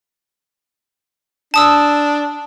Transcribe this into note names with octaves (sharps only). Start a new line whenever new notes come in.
D4 A5 D#6 E6